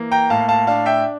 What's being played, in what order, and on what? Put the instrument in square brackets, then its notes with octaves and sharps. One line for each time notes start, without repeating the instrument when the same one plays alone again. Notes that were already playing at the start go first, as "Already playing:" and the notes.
Already playing: [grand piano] E3 A#3
G5 A#5
A2 F5 A5
F5 A5
D4 F5 A5
E5 G5